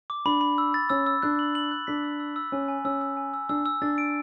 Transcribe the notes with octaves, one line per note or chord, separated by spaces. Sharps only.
D6
D4 B5
B5
E6
A6
C#4 E6
E6
D4 F#6
F#7
F#7
F#6
D4 B6
E6
E6
E6
C#4 G#5
G#5
C#4 E6
E6
G#5
E6
D4 E6
E6
D4 A6
D7